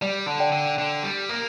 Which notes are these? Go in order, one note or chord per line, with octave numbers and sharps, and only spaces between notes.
G3 D5
D3
D5 G5
D3
D3
G3
A#3